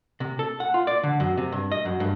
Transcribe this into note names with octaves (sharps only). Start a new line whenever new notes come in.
C3
A4
F#5
F4
D5
D3
F#2
C3
G2
D#5
F#2
G2